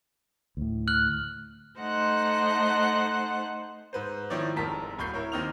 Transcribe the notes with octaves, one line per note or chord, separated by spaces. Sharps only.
D2 A2
F6 F#6 F#7
A3 D#4 C5 F#5 F#6
G#2 B4 C5
D#3 F3 E4 C#5 D5
F1 G#2 A#4 A5 B6
D1 B5 C#6 G6 C7
E4 A#4 C#5
D#2 C4 D#4 F6 F7